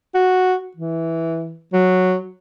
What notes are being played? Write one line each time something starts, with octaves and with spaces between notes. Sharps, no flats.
F#4
E3
F#3